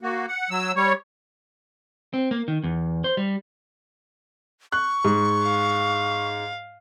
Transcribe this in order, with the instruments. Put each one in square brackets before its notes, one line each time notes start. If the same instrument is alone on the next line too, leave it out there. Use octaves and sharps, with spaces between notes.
[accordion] A#3 F#4
F#5
F#3 E6
G3 C#5
[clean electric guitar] C4
A#3
D#3
E2
C5
G3
[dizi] C#6 [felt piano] F#6
[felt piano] G#2
[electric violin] F5